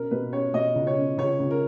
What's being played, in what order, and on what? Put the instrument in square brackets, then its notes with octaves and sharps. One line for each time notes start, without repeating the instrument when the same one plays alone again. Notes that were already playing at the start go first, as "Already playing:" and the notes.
Already playing: [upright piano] B2 C#4 A#4
B2 B4
C#4 C#5
B2 D#5
C#2
C#5
C#4
C#2 C#5
C#2
A#4